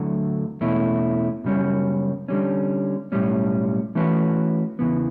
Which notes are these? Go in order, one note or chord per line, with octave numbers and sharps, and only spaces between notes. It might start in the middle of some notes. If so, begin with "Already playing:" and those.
Already playing: D2 D3 F#3 A3
E2 B2 A3 C#4 E4
F#2 C#3 G3 C#4
D3 G3 C#4
B1 A2 G3 C#4
E3 A3 C#4 F#4 B4
E2 C#3 E3 B3